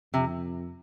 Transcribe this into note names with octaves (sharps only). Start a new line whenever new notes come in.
F2 C3